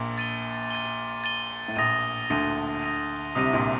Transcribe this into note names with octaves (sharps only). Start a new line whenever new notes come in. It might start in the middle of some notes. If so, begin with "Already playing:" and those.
Already playing: A#1 A#2
A6 D#7 G7
A6 D#7 G7
A6 D#7 G7
A2
A#1 A#2 D#6 A#6 D#7
D2 D3 D#6 A#6 D#7
D#6 A#6 D#7
C2 C3 D#6 A#6 D#7
A#1 A#2